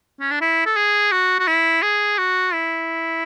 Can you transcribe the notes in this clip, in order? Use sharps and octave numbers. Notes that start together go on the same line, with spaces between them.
C#4
D4
E4
A4
G#4
F#4
F#4
E4
G#4
F#4
E4